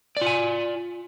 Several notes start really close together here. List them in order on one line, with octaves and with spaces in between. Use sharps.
D5 F4 G#5